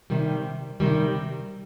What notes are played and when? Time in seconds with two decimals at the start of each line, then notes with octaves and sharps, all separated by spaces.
0.10 C3 D#3 G3
0.80 C3 D#3 G3